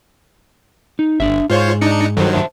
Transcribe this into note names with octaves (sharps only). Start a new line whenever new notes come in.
D#4
G1 D4 E5
G#2 F4 G#4 C5 C#5
D4 D#4 C#7
G2 D#3 F#3 A4 A#4 C5
C5 E5 A5